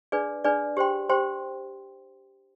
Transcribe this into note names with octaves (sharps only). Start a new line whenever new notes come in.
D4 G#4 B4 D5
D4 G#4 B4 D5
G4 C5 G5 C6
G4 C5 G5 C6